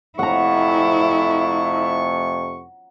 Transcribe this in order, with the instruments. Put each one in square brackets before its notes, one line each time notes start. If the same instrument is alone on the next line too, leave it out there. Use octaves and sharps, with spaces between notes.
[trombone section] F2 C3 A3 [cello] E4 [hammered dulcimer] F#5 A#5 [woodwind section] C#6